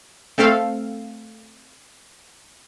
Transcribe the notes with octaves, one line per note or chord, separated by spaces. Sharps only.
A3 C4 A4 F5